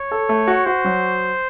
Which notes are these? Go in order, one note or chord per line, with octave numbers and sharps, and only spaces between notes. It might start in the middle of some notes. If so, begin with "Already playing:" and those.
Already playing: C#5
A4
A3
F#4
F#4 C5
F#3